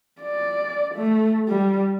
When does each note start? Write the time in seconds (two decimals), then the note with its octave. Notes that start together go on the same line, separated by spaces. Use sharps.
0.22 D5
0.95 A3
1.48 G3